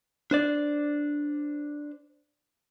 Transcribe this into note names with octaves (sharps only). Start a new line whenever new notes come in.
D4 C5 D5